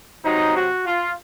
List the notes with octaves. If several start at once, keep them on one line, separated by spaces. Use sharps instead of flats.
C3 F#3 D#4
F#4
F4